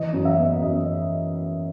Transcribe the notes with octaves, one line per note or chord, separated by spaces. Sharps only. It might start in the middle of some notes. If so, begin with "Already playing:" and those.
Already playing: E3 D#5
F#2
E5
B3
F#2 D#5